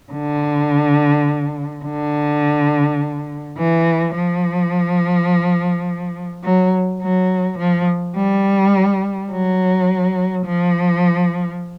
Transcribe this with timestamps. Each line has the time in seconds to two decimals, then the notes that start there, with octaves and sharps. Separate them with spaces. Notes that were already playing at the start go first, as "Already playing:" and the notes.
0.12 D3
1.84 D3
3.58 E3
4.15 F3
6.44 F#3
7.02 F#3
7.59 F3
8.16 G3
9.31 F#3
10.45 F3